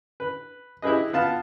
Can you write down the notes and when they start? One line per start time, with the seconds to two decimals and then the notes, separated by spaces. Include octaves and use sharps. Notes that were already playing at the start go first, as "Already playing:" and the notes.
0.20 B4
0.82 E4 G4 G#4 B4 D#5
1.13 B3 F4 A5